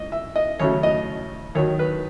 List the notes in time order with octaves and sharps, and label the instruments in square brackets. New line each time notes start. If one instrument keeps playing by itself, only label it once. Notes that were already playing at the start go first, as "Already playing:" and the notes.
Already playing: [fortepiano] C#2 D#5
E5
D#5
D#2 C#3 F#3 A3 C#5
D#5
D#2 D#3 F#3 C#5
B4